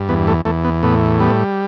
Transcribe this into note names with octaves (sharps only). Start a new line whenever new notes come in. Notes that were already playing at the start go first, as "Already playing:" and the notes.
Already playing: G2
E2 B3
A3
E2 A3
B3
A2 B3
G3 B3